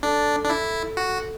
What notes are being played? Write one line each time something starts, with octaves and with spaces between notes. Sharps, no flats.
D4 A4
D4
E4
F#4